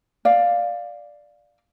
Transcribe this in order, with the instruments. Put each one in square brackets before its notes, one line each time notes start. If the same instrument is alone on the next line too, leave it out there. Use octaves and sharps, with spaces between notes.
[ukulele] D5 F5